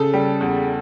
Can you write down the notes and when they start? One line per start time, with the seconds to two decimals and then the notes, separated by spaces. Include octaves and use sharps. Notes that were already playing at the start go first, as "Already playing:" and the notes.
Already playing: C#3 A4
0.13 G3
0.41 E2